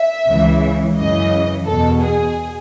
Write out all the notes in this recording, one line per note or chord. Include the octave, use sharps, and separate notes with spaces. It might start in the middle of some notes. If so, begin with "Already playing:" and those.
Already playing: E5
C#2 C#3 E3
F#2 C#3 E3 D#5
E2 B2 A4
G#4